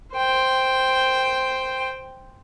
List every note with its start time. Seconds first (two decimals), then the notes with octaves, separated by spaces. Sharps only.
0.15 C5 G5